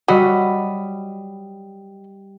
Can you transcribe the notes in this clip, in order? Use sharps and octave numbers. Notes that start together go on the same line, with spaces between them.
F#3 G3 F#4 D#5 B5